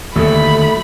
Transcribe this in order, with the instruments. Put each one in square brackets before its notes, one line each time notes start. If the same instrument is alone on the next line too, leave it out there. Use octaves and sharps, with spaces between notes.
[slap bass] D#2 D3 [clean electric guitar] F#3 A3 [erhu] B5